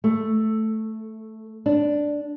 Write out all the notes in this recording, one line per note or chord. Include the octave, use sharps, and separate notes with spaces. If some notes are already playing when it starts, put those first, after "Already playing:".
A3
D4